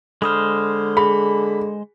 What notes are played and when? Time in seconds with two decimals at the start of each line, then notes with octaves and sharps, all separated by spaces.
0.22 D3 G#3 C5 B5 D#6 F6
0.97 G#4 B5